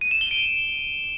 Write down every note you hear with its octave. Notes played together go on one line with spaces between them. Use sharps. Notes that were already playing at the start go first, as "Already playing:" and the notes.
D#7
E7
G7
D7